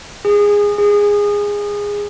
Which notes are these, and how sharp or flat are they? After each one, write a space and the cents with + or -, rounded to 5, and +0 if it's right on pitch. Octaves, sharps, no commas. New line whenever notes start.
G#4 -15
G#4 -15